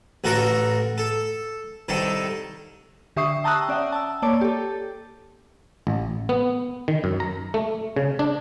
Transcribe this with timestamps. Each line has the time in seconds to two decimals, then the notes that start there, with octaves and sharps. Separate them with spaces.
0.24 A1 F#4 A4 A#4 C#6
0.98 A4
1.89 C2 D#3 A4
3.16 D3 G4 E5 C#6 D#6 C7
3.44 G5 A5 A#5 D#6 E6 F#6
3.69 C#4 D5 E5 F#5 G5
3.92 A5 E6
4.22 A#3 C#5 D5 A5 D6
4.41 G4 A4
5.87 A1
6.29 B3
6.88 D#3
7.04 F#2
7.20 A#5
7.54 A3
7.96 C#3
8.19 D4